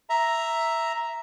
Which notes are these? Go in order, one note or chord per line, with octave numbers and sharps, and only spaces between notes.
E5 A#5